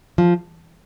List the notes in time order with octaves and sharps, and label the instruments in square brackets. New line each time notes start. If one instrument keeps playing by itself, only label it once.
[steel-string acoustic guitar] F3